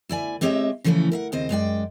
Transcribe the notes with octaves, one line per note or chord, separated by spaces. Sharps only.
D2 E4 D5 G#5
G#3 C4 G4 C#5 D#5 E5
C#3 E3 F3 A3 C4 C#4
A#4 E5 F#5
D#2 C#3 C4 C5 D#5
F#2 G#3 D5 G5